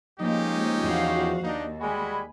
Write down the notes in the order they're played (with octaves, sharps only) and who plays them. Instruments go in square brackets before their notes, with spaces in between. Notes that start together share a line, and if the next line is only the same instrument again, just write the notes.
[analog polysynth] F3 [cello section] G#3 A#3 [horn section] C#4 D#4 G4
[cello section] E2 F#4 F5
[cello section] D#2 [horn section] D4 D#4
[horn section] G3 G#3 F#4 [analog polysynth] G#5 B5